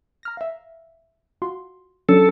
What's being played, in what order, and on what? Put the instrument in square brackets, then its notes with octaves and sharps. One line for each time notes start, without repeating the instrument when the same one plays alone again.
[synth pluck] A#5 F6 A#6
E5 F5
F4 F#4 C6
[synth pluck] F#3 C#4 D4 [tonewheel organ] A4